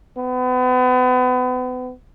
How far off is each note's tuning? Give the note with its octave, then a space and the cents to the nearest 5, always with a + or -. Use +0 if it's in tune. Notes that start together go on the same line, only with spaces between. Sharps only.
B3 +35